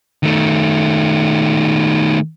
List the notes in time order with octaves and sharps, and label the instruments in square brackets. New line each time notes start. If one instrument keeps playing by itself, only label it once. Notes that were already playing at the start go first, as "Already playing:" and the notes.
[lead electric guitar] D#3 A3